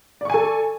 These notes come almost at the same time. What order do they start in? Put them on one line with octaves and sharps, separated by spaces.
D5 C#6 G#5 A4